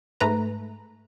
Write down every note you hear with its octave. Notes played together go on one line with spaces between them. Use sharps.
G#2 A3 B4 A#5